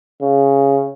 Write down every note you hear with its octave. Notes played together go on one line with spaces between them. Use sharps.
C#3